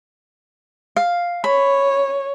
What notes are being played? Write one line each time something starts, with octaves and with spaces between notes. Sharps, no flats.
F5
C#5 B5